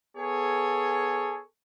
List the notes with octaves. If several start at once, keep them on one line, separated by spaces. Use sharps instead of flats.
B3 G#4 A4 C#5